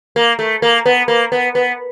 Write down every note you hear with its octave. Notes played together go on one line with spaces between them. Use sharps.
A#3
A3
A#3
B3
A#3
B3
B3